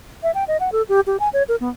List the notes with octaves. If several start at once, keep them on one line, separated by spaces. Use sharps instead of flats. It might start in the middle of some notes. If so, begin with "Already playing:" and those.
E5
G5
D#5
F#5
A4
G4
G4
G#5
C#5
A#4
B3